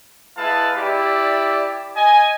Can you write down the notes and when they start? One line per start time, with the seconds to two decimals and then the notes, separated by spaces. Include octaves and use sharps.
0.37 G#3 E4 B4 F5 A5
0.76 E4 G4 D5
1.95 D#5 G#5